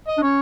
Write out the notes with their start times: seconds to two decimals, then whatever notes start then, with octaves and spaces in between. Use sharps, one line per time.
0.08 D#5
0.18 D4
0.23 C#4 C#5